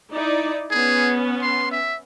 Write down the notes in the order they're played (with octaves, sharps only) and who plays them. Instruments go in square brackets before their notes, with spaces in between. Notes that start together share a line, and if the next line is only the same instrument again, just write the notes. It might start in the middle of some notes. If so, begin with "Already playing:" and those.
[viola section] D#4 E4 D5
[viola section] B3 C#4 [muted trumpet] G#4
[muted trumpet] C6
E5